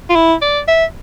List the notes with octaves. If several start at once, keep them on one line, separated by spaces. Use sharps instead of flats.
F4
E4
D5
E5